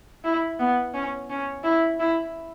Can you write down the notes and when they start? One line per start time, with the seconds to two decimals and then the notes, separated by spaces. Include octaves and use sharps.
0.24 E4
0.59 B3
0.94 C#4
1.30 C#4
1.64 E4
1.99 E4